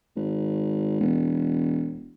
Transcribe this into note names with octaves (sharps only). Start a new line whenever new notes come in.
G#1
E1